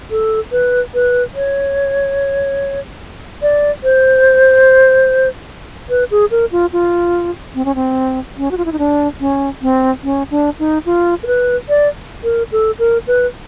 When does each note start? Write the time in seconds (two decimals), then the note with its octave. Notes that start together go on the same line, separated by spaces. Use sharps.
0.11 A4
0.52 B4
0.94 B4
1.35 C#5
3.42 D5
3.84 C5
5.90 B4
6.11 G#4
6.31 A#4
6.52 F4
6.73 F4
7.55 C4
7.65 C#4
7.75 C4
8.38 C#4
8.51 F#4
8.57 F4
8.65 E4
8.72 D#4
8.79 D4
9.20 C#4
9.62 C4
10.04 C#4
10.31 D4
10.59 D#4
10.86 F4
11.23 A#4
11.27 B4
11.69 D5
12.24 A#4
12.52 A4
12.79 A#4
13.07 B4